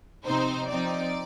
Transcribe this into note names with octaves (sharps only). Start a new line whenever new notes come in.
C3 F3 C4 D#4 C5
F3 C4 D#4 D5